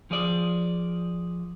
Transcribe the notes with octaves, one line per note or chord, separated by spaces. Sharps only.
F3 G#4 D5